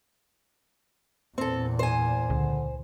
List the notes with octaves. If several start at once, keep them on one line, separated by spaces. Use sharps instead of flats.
E2 A#2 C4 A4
C5 G#5
C#2 D3